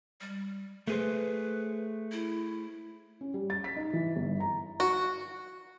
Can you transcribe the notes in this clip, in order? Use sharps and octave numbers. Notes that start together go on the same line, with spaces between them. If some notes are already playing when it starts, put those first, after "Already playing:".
G3
A3 G#4 B4 C5
E4
C#4
G3
A6
B6
D#4
E3
G1
A#5
F#4